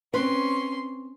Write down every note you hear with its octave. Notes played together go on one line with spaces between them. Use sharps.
C4 C#4 B4 C6